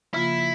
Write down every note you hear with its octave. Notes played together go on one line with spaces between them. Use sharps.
C#3 F3 A#3 E4 F4